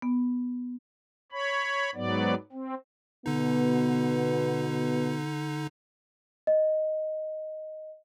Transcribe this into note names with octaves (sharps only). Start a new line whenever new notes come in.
B3
C#5 B5
G#2 F#3 B3 D5
C4
B2 D3 B3 D#4
D#5